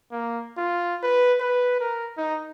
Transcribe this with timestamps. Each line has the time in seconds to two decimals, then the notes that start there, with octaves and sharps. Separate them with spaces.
0.11 A#3
0.57 F4
1.03 B4
1.40 B4
1.80 A#4
2.17 D#4